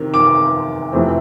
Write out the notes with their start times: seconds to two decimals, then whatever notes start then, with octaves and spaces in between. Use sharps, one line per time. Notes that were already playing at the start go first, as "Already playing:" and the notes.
Already playing: C3 D#3
0.14 D6
0.92 F2 C3 E3 A3 C4